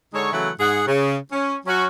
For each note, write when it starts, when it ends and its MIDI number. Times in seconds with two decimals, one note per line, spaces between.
0.14 0.31 50
0.14 0.31 56
0.14 0.31 63
0.14 0.31 69
0.14 0.31 73
0.32 0.50 49
0.32 0.50 52
0.32 0.50 54
0.32 0.50 57
0.32 0.50 64
0.32 0.50 78
0.60 0.81 44
0.60 0.81 68
0.60 0.81 78
0.87 1.16 49
1.33 1.55 61
1.66 1.86 54
1.66 1.86 61
1.66 1.86 66